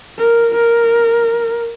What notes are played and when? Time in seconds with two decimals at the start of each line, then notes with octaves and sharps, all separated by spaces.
0.19 A#4
0.55 A#4